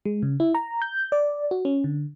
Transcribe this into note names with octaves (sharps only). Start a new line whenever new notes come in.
G#3
C#3
E4
A#5
G6
D5
F#4
C#4
D3